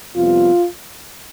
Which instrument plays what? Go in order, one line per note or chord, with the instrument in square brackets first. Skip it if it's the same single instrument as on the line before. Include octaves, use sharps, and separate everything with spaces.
[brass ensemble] F2 C3 G3 B3 F4